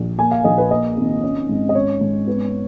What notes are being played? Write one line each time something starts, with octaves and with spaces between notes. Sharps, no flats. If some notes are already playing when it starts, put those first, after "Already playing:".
Already playing: A#1
A#3 G#5
F5
A#1 D#5
B4
A#3 D#5
G#1
C#4
G#2
D#5
C#4 C#5
G#2
B3